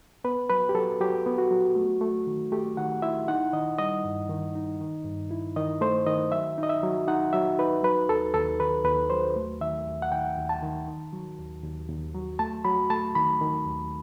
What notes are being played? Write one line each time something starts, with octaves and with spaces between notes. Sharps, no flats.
B3 B4
F#3 B4
G4
F#3 A4
F#3 G4
B3
F#4
F#3
A3
A3
D#3
A3 G4
D#3 F#5
E4 E5
D#4 F#5
D#3 D#5
G3 D#5
G2
D#3
D#4
D#3
G2
E4
D#3 D#5
A3 C5
D#3 D#5
F#3 E5
D#4
D#5
E5
F#3
D#4 F#5
F#3 E5
D#4 B4
F#3 B4
D#2 A4
D#2 A4
D#3 B4
D#2 B4
F#3 C5
A3
D#3 E5
D#2
F#5
D#3 G5
D#2
A5
D#3
D#3
F#3
D#2
D#2
D#2
F#3
A3 A5
F#3 B5
A3 A5
D#3 B5
D#3
D#2